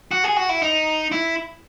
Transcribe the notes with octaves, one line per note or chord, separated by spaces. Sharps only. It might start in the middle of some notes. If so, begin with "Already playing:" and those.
F#4
G#4
F#4
E4
D#4
E4